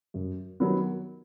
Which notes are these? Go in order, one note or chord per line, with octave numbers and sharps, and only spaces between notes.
F#2
D#3 F#3 B3